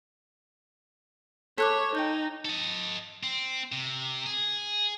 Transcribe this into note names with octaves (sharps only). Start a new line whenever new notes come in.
A4 C#5 D6 F#6 B6
D#4 G5 G6
A4 D#5
C4
C3
G#4